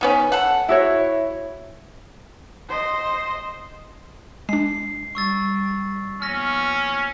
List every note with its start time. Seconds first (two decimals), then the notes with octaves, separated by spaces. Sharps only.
0.01 D#3 B3 C#4
0.32 A4 F#5
0.69 E4 F#4 C#5 E5
2.69 C5 D#5
4.49 G#3 D4 C7
5.15 G3 C#6 E6 A6
6.22 D#2 F3 B3 C#4 F6 A#6